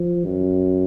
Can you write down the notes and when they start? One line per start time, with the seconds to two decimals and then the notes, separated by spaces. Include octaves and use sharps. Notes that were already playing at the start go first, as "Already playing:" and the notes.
Already playing: F3
0.26 F#2